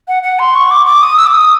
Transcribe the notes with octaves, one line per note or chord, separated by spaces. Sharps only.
F#5
F#5
C6
C#6
D6
D6
D#6
E6
D6
D#6